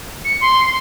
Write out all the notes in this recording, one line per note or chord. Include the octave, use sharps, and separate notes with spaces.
C#7
C6
C6